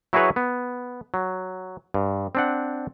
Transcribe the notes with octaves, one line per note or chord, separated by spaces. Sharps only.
F#3 E4 F#4 G#4 B4 C#5
B3
F#3
G2
C4 D4 F#5